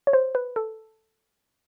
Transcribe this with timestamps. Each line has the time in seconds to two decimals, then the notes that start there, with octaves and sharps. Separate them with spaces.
0.07 C#5
0.13 C5
0.35 B4
0.56 A4